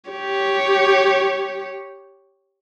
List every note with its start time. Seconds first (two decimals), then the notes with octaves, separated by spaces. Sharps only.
0.11 G4 C#5